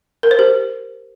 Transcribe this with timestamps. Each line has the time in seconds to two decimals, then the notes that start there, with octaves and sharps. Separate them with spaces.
0.23 A#4
0.31 C5
0.39 G4